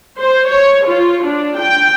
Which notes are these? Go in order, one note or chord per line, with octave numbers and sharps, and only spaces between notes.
C5
C#5
F4
D4
G5